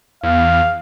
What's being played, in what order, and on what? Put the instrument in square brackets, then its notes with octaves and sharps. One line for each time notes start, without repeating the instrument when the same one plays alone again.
[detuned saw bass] E2 [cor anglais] F5